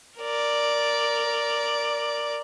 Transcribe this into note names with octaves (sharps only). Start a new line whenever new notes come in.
A#4 D5